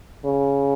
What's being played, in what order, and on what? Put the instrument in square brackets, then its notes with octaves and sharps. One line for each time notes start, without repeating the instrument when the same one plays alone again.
[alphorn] C#3